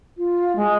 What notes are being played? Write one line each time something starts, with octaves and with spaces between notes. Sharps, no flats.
F4
G#3